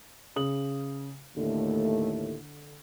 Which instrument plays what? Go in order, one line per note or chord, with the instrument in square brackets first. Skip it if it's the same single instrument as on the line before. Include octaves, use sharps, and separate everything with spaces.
[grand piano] C#3 D#6 F#7
[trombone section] D#2 A2 A3 [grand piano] D3